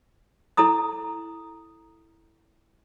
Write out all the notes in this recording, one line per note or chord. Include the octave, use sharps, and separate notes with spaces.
E4 A4 A#5 D#6